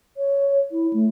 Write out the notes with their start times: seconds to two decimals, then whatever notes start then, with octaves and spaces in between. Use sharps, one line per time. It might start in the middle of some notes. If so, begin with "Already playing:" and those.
0.17 C#5
0.72 E4
0.93 A3